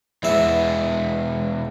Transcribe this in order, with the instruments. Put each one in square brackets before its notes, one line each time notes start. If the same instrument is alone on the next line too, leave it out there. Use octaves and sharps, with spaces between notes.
[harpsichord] E2 E5 [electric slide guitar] E3 G#3 B3